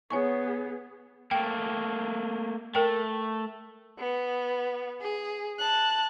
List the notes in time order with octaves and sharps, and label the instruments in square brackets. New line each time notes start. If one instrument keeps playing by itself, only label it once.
[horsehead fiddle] B3 G#4 [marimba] C#5 G#5 C#6
[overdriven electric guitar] A3 A#3 [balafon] G5
[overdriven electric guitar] A3 [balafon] A#4 G5
[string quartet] B3
G#4
A5 F#6